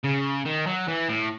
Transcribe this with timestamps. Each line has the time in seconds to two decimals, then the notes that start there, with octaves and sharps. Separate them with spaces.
0.04 C#3
0.45 D#3
0.67 F#3
0.88 E3
1.09 A2